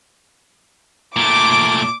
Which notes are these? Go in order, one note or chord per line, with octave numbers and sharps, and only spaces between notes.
A#2 A3 D6